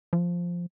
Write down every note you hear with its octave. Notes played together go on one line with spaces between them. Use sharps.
F3